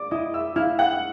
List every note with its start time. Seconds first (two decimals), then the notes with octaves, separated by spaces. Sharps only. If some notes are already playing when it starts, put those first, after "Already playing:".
Already playing: D5 D6
0.11 E4 D#5 D#6
0.34 E5 E6
0.56 E4 F5 F6
0.79 F#5 F#6